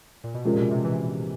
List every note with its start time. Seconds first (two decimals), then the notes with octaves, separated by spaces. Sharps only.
0.24 A#2
0.34 B2
0.45 C3 F3 G#3 C#4 F4 A#4
0.53 A#2
0.58 B2
0.71 C3
0.84 E3